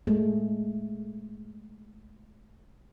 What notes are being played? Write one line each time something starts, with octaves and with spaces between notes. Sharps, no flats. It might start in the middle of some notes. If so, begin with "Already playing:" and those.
G#3 A3